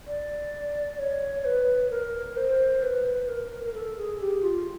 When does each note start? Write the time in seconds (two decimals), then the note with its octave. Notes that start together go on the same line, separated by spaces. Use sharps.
0.07 D5
0.99 C#5
1.45 B4
1.90 A#4
2.37 C5
2.82 B4
3.28 A#4
3.64 A#4
3.74 A4
3.97 G#4
4.21 G4
4.43 F4